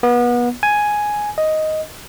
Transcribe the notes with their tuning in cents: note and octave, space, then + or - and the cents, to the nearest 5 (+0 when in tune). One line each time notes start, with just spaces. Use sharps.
B3 -30
G#5 +5
D#5 +5